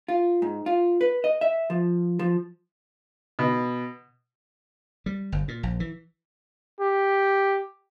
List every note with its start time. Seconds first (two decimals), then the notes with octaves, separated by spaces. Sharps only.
0.08 F4
0.42 G#2
0.66 F4
1.01 B4
1.24 D#5
1.41 E5
1.70 F3
2.19 F3
3.39 B2
5.06 G3
5.32 G1
5.48 A#2
5.63 A#1
5.80 E3
6.81 G4